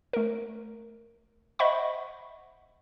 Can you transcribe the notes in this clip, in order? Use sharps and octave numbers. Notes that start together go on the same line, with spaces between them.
A3 A#4
C5 D#5 E5 F#5 B5 C#6